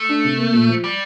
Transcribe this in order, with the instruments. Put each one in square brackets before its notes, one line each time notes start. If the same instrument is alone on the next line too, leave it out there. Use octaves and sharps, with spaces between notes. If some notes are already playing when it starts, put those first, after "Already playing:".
Already playing: [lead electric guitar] A3
[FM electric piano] D4
C3
A#3
A#2
F3
[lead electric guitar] G3